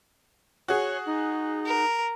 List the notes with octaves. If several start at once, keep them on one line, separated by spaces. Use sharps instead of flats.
F#4 G#4 C#5
D#4
A#4